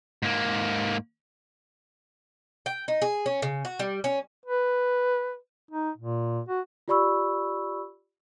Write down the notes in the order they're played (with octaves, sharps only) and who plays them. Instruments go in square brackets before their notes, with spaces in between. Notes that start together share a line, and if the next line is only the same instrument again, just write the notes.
[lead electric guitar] G#2 A#3
[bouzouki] G5
D#4
G#4
C#4
C#3
F#4
G3
C#4
[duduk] B4
D#4
A#2
F#4
[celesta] F4 G4 D5 B5 C#6 E6